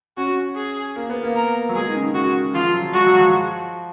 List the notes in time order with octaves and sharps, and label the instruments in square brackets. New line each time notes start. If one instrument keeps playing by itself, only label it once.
[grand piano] C#4 [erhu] F#4
[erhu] G#4
[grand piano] A#3
B3
A#3
[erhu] A#4
[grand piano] F#3
[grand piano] G#3 [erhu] G#4
[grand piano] D#3
C#3
[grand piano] C#3 [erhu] F#4
[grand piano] F3 [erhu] F4
[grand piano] F#3
[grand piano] G#3 [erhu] F#4
[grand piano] F#3
F3